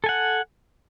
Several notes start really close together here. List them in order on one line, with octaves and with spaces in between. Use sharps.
A4 G#5 F#5